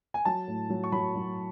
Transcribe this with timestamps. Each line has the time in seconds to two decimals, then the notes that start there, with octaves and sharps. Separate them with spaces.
0.14 G#5
0.25 F#3 A5
0.48 A2
0.70 F#3
0.84 C#6
0.92 F#3 B5
1.15 F#3